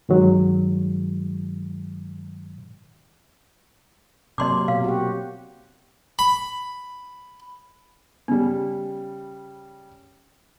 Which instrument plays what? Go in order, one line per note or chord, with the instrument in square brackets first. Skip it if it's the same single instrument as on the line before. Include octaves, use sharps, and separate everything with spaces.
[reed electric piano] G2 D#3 F#3 G#3
[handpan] C3 F#3 A#3 [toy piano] D#5 C6 D6
[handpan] B2 [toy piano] F5
[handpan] F#4 G4
[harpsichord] B5
[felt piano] C#3 G3 [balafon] B3